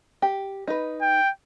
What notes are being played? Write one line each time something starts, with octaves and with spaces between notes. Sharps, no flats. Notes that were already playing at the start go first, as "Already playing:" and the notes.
G4
D#4 B4
G5